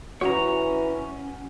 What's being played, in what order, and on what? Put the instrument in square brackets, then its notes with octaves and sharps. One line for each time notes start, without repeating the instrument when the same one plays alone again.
[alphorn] E3 [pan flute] C#4 [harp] F#4 [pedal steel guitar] C#5 A#5